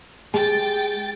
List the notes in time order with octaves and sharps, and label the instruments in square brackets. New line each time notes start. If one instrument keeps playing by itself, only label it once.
[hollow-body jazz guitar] G#3 G4 G#4 [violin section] G5 A6